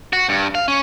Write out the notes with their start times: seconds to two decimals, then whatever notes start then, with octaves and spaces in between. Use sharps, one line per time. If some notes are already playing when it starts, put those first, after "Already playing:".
0.13 F#4
0.29 G2
0.55 F5
0.68 C#4